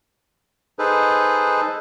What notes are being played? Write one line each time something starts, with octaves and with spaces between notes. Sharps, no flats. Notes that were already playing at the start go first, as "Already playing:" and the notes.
D#4 G#4 A4 B4 C5